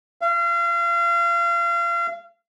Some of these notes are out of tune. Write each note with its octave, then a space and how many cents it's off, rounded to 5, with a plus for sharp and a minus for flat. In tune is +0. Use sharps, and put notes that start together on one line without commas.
F5 -35